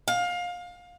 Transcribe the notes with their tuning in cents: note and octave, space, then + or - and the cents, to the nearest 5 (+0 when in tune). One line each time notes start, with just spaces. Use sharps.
F5 +25